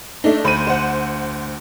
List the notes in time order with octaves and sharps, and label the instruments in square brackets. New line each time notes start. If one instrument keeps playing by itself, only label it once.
[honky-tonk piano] A3 D4 D#4
[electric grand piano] D2 D#7 [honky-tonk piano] C5 B5
[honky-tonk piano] C5 F#5